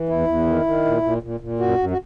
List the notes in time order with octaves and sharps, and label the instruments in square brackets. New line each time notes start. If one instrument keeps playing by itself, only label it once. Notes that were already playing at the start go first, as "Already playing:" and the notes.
Already playing: [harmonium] E3
E2 E4
E2
D#3
D#3
A#2
A#2
A#2
A#2
F#2 F#4
F#2
F#4